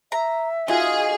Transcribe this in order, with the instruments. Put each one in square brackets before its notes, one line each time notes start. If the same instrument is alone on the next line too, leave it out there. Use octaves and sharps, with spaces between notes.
[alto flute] E5 [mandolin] A#5
[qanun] D#4 F4 F#4 [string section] G#4 [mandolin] D#5